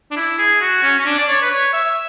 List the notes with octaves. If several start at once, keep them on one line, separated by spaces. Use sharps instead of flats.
D4
E4
G#4
F#4
C#4
C#4
D4
D5
C#5
B4
C#5
E5